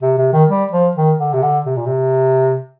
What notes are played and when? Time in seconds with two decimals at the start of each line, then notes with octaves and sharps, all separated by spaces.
0.02 C3
0.18 C3
0.33 D#3
0.49 G3
0.72 F3
0.96 D#3
1.19 D3
1.34 C3
1.43 D3
1.66 C3
1.77 A#2
1.87 C3